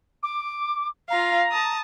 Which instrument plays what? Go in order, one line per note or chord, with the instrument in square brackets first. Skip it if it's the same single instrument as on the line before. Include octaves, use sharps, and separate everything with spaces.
[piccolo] D6
[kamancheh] F4 F5 [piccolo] A#5
[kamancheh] A5 D#6